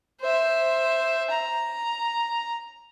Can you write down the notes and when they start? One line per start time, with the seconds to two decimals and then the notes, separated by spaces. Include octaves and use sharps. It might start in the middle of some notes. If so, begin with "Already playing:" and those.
0.21 C5 E5
1.31 A#5